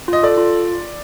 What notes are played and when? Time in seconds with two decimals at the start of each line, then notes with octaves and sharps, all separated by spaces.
0.08 F4 D#5
0.23 A4 D5
0.37 F4